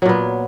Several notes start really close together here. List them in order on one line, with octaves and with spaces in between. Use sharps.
F#3 A#2 B3